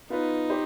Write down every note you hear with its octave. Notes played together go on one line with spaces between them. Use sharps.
B3 D#4 F4 B4
G4 C5